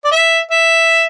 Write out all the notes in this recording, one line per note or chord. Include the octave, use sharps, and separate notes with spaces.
D5
E5
E5